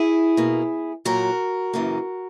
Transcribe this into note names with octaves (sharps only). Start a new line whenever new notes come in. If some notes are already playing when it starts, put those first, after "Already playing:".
Already playing: E4 G#4
B2 A#3
A#2 F#3 A#3 F#4 A#4
F#2 C#3 E3 A#3